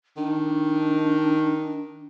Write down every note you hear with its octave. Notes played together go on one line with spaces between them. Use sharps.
D#3 D4